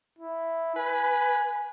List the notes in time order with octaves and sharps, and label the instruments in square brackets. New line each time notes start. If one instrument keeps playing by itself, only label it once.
[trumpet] E4
[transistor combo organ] B4 [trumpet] G#5